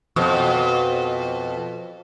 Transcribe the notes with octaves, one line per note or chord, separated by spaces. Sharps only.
F2 B2